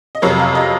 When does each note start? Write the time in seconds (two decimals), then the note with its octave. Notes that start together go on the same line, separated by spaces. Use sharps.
0.15 D#5
0.22 F2 C3 F#3 A#3 C#5
0.39 F5
0.55 D#5